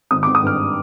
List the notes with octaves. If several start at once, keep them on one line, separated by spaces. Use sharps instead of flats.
G#1 D#6
D6
G#1
D#6
G2 F6